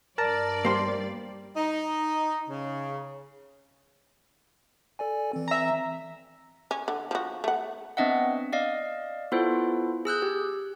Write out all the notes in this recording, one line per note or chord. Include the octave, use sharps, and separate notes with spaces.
G2 A#4 D5 A5 A#6
G3 A#3 C5
D#4
C#3
A4 D5 G#5
E3 C4
E5 A#5
C#4
D3
F3 F#4
A3 F#5
B3 C4 D4 D#5 E5 F#5
D5 D#5 F5
B3 E4 F4 A4 C5
G#4 E6 F#6 G6
G4